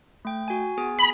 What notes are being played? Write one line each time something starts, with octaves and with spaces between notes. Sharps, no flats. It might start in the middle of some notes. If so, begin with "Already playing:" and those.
A3 G5
F#4 G#5
B3 G#4 G#5
B5